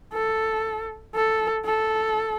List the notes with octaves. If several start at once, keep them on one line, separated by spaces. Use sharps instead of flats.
A4
A4
A4